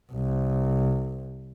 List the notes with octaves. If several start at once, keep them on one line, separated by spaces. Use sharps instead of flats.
C2